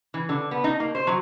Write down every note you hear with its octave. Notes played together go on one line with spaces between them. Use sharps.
E3
D3
B3
D#4
A#3
C5
F#3